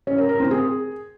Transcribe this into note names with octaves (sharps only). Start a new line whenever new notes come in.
C#4
A#4
A#4
C4
G#4